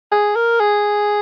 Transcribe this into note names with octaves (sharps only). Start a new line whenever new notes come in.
G#4
A#4
G#4